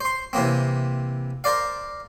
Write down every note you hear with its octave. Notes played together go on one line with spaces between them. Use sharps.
C5 C6
C3 E3 A#3 C4
A#4 C5 D5 F5